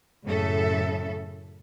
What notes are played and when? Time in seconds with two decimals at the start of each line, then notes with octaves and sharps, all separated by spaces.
0.24 F#2 A2 C#3 A4 E5